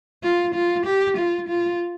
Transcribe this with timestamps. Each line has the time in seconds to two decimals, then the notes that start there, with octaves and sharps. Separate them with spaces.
0.23 F4
0.55 F4
0.86 G4
1.17 F4
1.49 F4